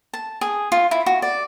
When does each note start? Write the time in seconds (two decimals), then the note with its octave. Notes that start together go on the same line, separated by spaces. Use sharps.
0.14 A5
0.41 G#4
0.72 F4
0.91 E4
1.06 F#4
1.22 D5